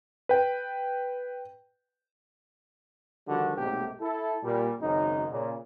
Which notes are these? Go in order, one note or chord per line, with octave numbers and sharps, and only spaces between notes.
B4 G5
D3 D#3 F3 G3 F#4
B1 G#2 C3 A3 A#3 G4
E4 A4
A#2 G3
G#1 F#2 C#3 C#4 D#4
A#2 C#3